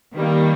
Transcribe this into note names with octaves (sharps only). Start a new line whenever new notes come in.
D#3 G3 A#3